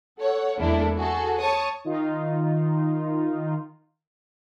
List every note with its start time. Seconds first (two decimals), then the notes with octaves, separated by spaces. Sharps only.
0.20 A4 C#5 F#5
0.58 E2 G#3 A#3 D4 E4 A4
0.96 F#4 G#4 A4
1.40 C#5 A5 C#6 D#6
1.85 D#3 D#4 F4